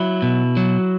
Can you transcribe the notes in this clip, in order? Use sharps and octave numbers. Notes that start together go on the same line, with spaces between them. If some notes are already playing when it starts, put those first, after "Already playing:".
Already playing: F#3 E4
B2
F#3